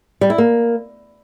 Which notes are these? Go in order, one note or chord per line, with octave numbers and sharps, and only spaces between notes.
G3
E4
A#3